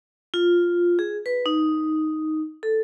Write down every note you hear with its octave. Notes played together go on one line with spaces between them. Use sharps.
F4
G#4
B4
D#4
A4